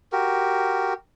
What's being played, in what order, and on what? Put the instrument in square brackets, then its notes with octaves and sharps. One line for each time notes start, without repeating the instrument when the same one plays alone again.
[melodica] F#4 G4 A#4